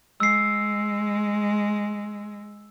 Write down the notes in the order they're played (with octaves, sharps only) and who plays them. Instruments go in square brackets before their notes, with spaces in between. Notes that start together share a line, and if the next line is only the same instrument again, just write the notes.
[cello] G#3 [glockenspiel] E6 C7